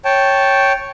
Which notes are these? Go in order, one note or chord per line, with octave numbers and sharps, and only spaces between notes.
C#5 G5 A5